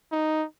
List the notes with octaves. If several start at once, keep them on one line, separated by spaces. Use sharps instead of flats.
D#4